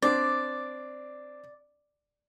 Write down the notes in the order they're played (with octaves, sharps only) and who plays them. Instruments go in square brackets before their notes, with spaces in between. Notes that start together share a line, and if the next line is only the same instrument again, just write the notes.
[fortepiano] C4 D4 [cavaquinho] D5